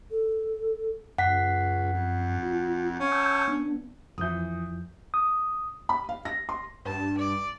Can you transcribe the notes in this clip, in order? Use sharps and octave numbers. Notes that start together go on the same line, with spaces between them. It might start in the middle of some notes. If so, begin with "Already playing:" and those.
A4
C#2 F#2 F#5 B6
F2
F4
C#4 F5
A5 E6 G6
B3 D4
F2 E3 F3 D#6 G6
D#6
B5
F5
A#6
C6
G2 A5
D5